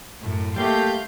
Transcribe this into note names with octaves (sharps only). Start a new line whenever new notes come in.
F#2 A2
G3 A3 A#3 G4 F5 C6 G6